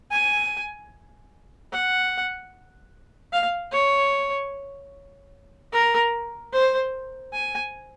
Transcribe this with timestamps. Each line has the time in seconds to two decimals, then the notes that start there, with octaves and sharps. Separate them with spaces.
0.11 G#5
1.72 F#5
3.33 F5
3.72 C#5
5.73 A#4
6.53 C5
7.33 G#5